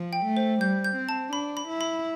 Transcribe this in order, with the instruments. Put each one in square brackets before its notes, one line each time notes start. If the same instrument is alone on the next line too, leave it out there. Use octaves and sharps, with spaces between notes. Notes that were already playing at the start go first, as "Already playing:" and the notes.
Already playing: [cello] F3
[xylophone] G5
[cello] A3
[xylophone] C5
[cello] G3 [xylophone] G6
[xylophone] G6
[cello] C4
[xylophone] A5
[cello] D4 [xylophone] B5
[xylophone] B5
[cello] E4
[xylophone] B5